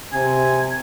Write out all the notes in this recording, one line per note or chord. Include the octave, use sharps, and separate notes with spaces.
C3 G#5